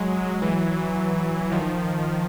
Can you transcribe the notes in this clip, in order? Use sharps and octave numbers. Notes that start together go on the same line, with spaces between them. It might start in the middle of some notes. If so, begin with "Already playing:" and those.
Already playing: F#3 G#3
E3 F#3
D#3 F3